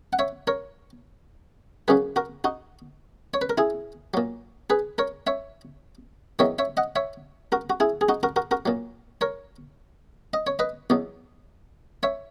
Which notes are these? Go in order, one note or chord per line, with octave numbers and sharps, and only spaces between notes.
F#5
C#5 E5
A#4 C#5
F#2 C#3 F#3 G#4 B4
F#4 A#4
D#4 F#4
C#5
B4
A#4
E4 G#4
A#2 F#3
G#4 B4
A#4 C#5
C#5 E5
E2 D#3 F#3 C#5 E5
C#5 E5
D#5 F#5
C#5 E5
F#4 A#4
F#4
E4 G#4
G#4
D#4 F#4
F#4 A#4
F#4 A#4
F#4 A#4
A#2 F#3
A#4 C#5
D#5
C#5
B4 D#5
E2 B2 F#3
C#5 E5